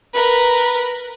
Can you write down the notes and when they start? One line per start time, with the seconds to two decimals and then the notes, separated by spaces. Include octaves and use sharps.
0.14 A#4 B4